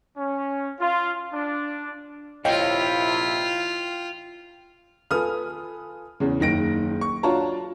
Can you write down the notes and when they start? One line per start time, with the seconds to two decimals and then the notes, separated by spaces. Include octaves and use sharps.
0.17 C#4
0.80 F4
1.33 D4
2.45 A#1 C3 E4 F4 C#5 D#5 F5 G5
5.11 F4 A4 B4 G#5 D#6 F6
6.20 E2 C#3
6.40 F#1 D#3 A#6 D7
7.01 C#6
7.23 D4 F4 F#4 C#5 A5 A#5